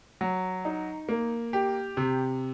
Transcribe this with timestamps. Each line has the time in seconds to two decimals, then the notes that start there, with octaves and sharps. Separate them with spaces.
0.21 F#3
0.65 D#4
1.09 A#3
1.53 G4
1.97 C3